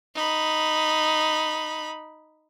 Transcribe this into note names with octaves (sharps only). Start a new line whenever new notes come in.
D#4 B5